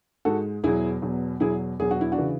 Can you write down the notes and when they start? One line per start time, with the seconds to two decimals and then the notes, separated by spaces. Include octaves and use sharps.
0.25 G#2 G#3 F#4 A4
0.63 E2 B2 F#3 E4 G#4
1.02 E2 B2 F#3
1.40 E2 B2 F#3 E4 G#4
1.79 E2 B2 F#3 G#4
1.91 F#4
2.01 E4
2.12 D4 F#4
2.18 C#3 E3